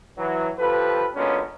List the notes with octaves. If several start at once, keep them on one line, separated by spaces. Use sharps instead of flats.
E3 F#3
F3 G4 A4 B4
A#2 D3 F#3 G#3 B3 C#4